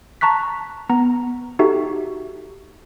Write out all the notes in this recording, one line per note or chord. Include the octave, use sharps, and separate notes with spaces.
A5 A#5 C#6 F#6 B6
B3 A#5
D#4 F#4 G4 A4 E5